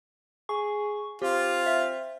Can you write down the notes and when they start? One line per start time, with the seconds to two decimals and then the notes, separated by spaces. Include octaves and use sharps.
0.49 G#4 C#6
1.22 C4 F4 G4
1.66 E5